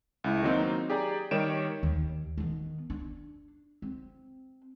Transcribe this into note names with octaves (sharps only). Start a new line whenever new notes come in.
C#2 E4
D#3 F#3 A#3 C4 D#4
G4 G#4 D5 A#5
D#3 G3 G4 C#5 D7 E7
D#2
D#3 B3
D4
C4